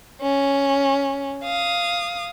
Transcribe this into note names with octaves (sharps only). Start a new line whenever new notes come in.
C#4
F5 D#6